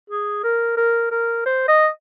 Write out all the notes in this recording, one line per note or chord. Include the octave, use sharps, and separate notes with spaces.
G#4
A#4
A#4
A#4
C5
D#5